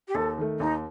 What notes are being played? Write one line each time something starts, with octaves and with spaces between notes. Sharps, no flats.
G4
D#2 A4
D#3 A3
D#2 D#4